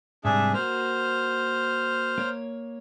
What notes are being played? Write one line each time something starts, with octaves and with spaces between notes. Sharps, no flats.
G#2 C3 G3 D4 G#4 E5
A#3 F#4 C5 F6
A#3 C#5